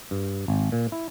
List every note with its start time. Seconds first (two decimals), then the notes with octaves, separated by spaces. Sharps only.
0.11 G2
0.48 G#1
0.72 A#2
0.92 E4